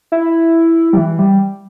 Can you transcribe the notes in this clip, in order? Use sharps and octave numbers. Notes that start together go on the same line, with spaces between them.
E4
G3
E3
G3